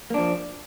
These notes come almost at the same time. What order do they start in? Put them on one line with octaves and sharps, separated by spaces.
A#3 D4 F3